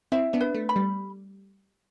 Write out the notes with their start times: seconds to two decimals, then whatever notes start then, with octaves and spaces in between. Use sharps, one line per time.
0.12 C4 E4 E5
0.33 B3 D4
0.41 B4
0.55 A3
0.69 B5
0.76 G3